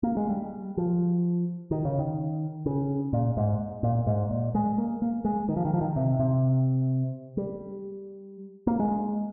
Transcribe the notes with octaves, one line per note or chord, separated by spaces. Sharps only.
A#3
G#3
G3
F3
D#3
C#3
D#3
C#3
A#2
G#2
A#2
G#2
A#2
G#3
A#3
A#3
G#3
D#3
F3
D#3
F3
D#3
C3
C3
G3
A#3
G#3